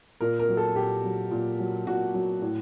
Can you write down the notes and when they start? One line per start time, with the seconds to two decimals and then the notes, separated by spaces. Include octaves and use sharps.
0.21 A#2 A#4
0.39 A#4
0.49 F#3
0.57 A4
0.76 A#2 G4
1.04 F#3
1.31 A#2
1.59 F#3
1.87 A#2 F#4
2.14 F#3
2.42 A2